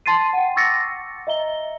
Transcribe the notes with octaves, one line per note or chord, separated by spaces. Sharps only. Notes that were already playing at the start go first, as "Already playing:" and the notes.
A5 C6 A6 C7 D#7
F#5 G5
C#6 D6 E6 A6 A#6 C#7
D#5 E5 A#5 G7